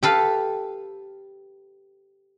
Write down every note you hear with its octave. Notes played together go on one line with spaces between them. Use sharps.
G4 A4 B4 F5